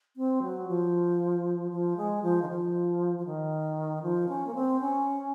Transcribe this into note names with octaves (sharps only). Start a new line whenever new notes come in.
C4
F#3
F3
F3
G#3
F3
D#3
F3
F3
D#3
F3
C#4
A#3
C4
C#4